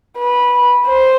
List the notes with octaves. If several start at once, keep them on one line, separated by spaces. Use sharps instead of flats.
B4
C5